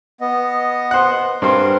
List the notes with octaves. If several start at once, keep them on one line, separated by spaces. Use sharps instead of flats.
B3 D#5
C5 F#5
G2 C4 A#4 C5